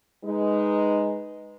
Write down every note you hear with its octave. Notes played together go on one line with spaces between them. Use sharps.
G#3 D#4 B4